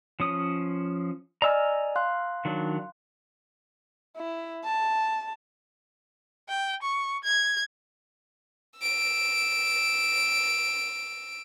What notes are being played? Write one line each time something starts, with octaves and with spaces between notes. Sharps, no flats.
F3 C#4 D#6
D5 D#5 G#5 A#5 E6 F6
F5 C6 F#6
D#3 F#3 D4
E4
A5
G5
C#6
G#6
E6 D7